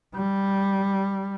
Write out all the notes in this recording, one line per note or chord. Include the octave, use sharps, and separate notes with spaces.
G3